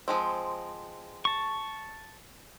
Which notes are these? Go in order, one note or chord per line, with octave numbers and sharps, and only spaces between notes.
F3 G#3 C4
A5 C#6